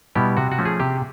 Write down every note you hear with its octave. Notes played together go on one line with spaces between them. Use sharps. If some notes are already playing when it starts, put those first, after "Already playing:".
B2 G3 B3 E4 G4
C3 F#4
F#4
F3 A3 C#4
G#4
C3 G4